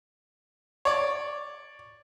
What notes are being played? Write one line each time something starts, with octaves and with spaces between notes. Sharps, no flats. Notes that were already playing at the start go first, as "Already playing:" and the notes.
C#5 D5